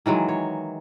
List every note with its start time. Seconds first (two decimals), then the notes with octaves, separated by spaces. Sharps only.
0.06 D#3 E3 F#3 G#3
0.29 C#5